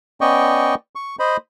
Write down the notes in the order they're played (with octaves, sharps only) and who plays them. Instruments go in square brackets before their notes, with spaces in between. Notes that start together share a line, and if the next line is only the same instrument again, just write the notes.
[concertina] B3 C#4 D5 D#5 G5 C#6
C#6
C5 D#5 B5